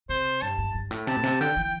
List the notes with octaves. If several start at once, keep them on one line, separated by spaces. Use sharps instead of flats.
C3 C5
G2 A5
G2
G2
A2
C3 A5
A2
C3
D3 G5
E3
G5